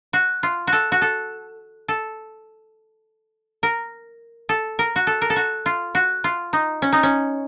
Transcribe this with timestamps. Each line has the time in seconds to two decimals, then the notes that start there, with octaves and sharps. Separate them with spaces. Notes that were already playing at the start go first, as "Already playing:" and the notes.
0.13 F#4
0.43 F4
0.67 F#4
0.73 A4
0.92 F#4
1.02 A4
1.88 A4
3.63 A#4
4.49 A4
4.79 A#4
4.96 F#4
5.07 A4
5.22 A#4
5.30 A4
5.36 F#4
5.66 F4
5.95 F#4
6.24 F4
6.53 D#4
6.82 C#4
6.93 D#4
7.03 C#4